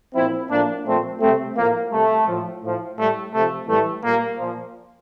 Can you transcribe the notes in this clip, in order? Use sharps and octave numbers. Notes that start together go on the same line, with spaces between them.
A#2 F3 C4 E4
A2 F3 A#3 D4
A#2 F3 A3 C4
C3 G3 A3 C4
A2 F3 A#3
C3 G3 A3
A2 F3
A2 F3
A2 G3 A3
C3 F3 A3
A2 E3 G3 A3
A#2 G3 A#3
A#2 F3